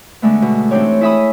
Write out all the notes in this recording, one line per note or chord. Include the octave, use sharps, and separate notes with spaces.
D3 G#3 A3 B3
B2
E3 C4 D4 D#4 G4 C#5
E4 G#4 E5 B5 D#6